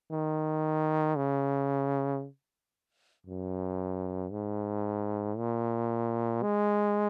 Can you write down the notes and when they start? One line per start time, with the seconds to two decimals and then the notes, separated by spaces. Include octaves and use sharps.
0.12 D#3
1.16 C#3
3.27 F#2
4.31 G#2
5.37 A#2
6.42 G#3